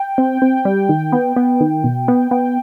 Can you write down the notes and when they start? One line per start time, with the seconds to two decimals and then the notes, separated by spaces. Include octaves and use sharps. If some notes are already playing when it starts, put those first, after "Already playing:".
Already playing: G5
0.18 C4
0.42 C4
0.65 G3
0.89 D#3
1.12 B3
1.36 B3
1.60 D#3
1.84 B2
2.08 B3
2.31 B3